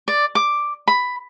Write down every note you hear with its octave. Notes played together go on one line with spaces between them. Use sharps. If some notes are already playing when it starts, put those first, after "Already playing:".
D5
D6
B5